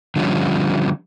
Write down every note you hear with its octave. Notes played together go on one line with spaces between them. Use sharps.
D3 F3 G3 C#4